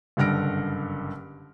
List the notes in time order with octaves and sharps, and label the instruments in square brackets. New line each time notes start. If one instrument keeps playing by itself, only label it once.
[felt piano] F#1 G2 D3 F6 A#6 D7